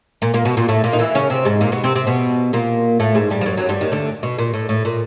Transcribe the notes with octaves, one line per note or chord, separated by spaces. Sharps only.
A#2 A#3
A#2 A#3
B2 B3
A#2 A#3
A2 A3
A#2 A#3
D#4
E3 E4
C#3 C#4
C3 C4
G#2 G#3
A#2 A#3
B2 B3
C3 C4
C3 C4
B2 B3
A#2 A#3
A2 A3
G#2 G#3
G2 G3
F3
F#2 F#3
F#2 F#3
G2 G3
D#2 D#3
D2 D3
B2
A#2
A2
A2
A#2